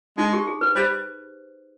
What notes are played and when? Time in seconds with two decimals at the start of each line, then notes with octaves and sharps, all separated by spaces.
0.18 G#3 D#4
0.33 G4
0.47 G#4
0.61 B4
0.75 G3 C5